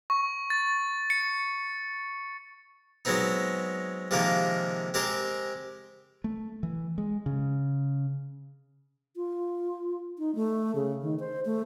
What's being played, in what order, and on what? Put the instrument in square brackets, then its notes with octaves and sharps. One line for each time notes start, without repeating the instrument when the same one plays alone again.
[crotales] C#6
A6
C#7
[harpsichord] F#3 G#3 B3 C4 D#4
C3 D#3 F3 G#3 A#3 A#4
G#3 C4 G4 G#4 A#4 C5
[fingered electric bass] A3
E3
G#3
C#3
[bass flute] F4
D#4
A3
C#3
D#3
C5
A3